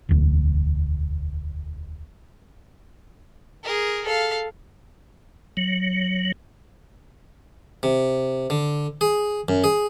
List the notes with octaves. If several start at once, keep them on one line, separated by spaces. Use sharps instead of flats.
E1 D2
G#4 A#4
A4 F5
F#3
C3
D3
G#4
F#2
G#4